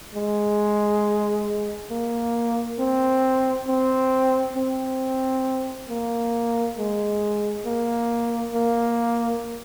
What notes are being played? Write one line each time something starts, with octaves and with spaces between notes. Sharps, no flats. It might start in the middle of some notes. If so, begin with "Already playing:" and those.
G#3
A#3
C4
C4
C4
A#3
G#3
A#3
A#3